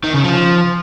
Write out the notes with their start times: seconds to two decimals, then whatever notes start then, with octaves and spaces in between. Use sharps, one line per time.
0.04 D#3
0.14 C#3
0.24 F3